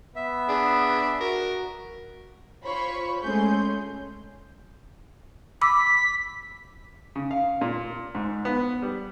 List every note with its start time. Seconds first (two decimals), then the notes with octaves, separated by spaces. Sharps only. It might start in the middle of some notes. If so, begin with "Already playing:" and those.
0.16 B3 E5
0.48 D4 G#4
1.21 F#4 A#4
2.64 F4 C5 C#5 B5 C#6
3.23 G#3 A3 C#4 G#4 C6 G6
5.61 B5 D6 E6 B6
7.16 C#3
7.31 F5
7.61 A#2
8.15 G#2
8.45 B3
8.82 G3